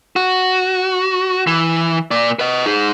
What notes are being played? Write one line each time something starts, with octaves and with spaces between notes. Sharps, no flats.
F#4
E3
A#2 D5
B4 D#5
D#4 G#4